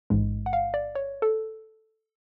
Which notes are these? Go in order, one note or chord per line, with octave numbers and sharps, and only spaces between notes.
A1 G#2 G#3
F#5
F5
D5
C#5
A4